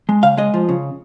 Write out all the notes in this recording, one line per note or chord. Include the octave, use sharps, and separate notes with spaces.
G#3
C#3 F5
G#3 D#5
F3
C#3